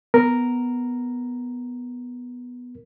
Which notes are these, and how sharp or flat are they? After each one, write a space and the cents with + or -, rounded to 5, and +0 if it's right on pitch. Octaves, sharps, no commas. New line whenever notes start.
B3 +0 A#4 +0